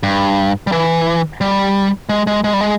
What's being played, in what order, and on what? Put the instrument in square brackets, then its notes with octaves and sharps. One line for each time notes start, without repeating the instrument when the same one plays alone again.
[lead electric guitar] G2
G3
E3
G3
G#3
G#3
G#3
G3
G#3